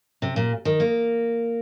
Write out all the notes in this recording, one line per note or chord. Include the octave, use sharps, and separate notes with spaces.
C3
A#2
D#3
A#3